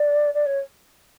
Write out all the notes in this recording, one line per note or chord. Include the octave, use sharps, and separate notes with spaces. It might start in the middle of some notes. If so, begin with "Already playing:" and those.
Already playing: D5
D5
C#5